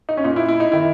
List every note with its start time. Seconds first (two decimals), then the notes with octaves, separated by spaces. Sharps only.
0.09 D#4
0.17 C#4
0.24 A#2 D#4
0.36 E4
0.48 E4
0.60 D#4
0.72 D#3 E4